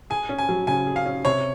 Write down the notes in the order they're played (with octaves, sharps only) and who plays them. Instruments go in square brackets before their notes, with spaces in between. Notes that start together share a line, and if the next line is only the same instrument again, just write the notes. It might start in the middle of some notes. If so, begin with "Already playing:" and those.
[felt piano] G#4 [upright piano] G#5
[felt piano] C#4
[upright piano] G#5
[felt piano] F#3
[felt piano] C#3 [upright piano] G#5
[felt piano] G#4
[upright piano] F5
[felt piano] C#4
[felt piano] C3 [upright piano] C#5